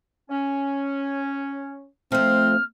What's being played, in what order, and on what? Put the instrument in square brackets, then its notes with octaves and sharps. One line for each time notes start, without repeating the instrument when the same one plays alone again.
[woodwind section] C#4
[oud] F3 A3 [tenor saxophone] C4 [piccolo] F6